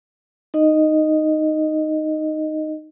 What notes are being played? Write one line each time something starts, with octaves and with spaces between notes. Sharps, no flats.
D#4 D#5